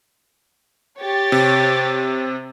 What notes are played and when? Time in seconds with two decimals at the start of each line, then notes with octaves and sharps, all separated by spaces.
1.00 G4 C#5 A6
1.32 C3